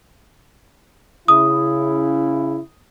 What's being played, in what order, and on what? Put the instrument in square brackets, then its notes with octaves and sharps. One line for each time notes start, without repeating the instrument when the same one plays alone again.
[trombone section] C#3 E4 [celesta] D#6